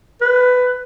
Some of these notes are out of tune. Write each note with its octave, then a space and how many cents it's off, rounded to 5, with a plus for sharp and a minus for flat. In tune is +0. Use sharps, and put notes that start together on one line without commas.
B4 +15